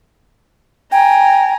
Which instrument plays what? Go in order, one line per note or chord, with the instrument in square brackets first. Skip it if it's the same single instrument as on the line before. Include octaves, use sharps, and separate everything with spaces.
[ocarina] G5 [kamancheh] G#5 A#5